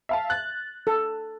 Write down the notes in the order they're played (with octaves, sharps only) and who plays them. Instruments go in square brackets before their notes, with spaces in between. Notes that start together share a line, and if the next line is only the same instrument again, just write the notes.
[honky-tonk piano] E5 F5 A5
F#6 A6
[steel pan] A4